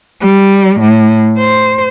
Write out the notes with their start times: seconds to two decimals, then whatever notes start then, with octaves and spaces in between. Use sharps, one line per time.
0.22 G3
0.80 A2
1.38 C5